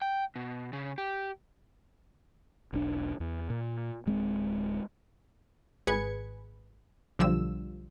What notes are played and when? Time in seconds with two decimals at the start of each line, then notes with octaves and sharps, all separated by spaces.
0.02 G5
0.36 B2
0.73 C#3
0.98 G4
2.73 E1 B1 D4
3.20 E2
3.50 A#2
4.06 D1 G#3 C4
5.87 G#1 G#4 B4 G#6 C#7
7.19 B1 D3 F3 G3 E6